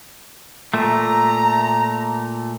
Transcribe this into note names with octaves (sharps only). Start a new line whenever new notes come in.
A#2 A3 A#5